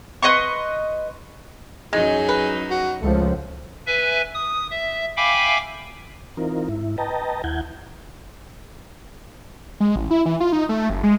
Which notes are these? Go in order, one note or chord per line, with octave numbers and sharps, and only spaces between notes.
B4 D#5 C6 C#6
F#2 F#3 G#3 D#4 G#4
B4
F#4
C#2 F3 A3
B4 E5 G#5
D#6
E5
E5 F5 G5 G#5 B5 D6
E3 C4 D#4 F4 A#4
G#2 E4
B4 D#5 G5 A5 A#5
D#2 E4 F#5 G6 G#6
G#3
A1
E4
E3
F4
D#4
A3
F#1
G#3